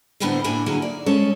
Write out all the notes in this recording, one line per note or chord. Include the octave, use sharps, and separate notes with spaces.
A2 D3 B3 C4 A#4 C5
A2 A#3 D4 G#5
D3 F#3 A#3 D#4 E4 G#4
D5
G#3 C#4 A4 C#5